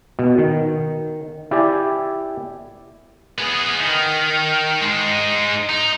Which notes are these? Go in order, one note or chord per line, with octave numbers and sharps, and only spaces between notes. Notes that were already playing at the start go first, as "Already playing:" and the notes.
B2
D#3
E4 G4 D5 G#5
B3 G#4
D#3
G#3 D#4
D#4